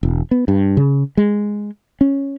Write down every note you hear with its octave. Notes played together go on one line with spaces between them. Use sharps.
E1
B3
G2
C#3
G#3
C#4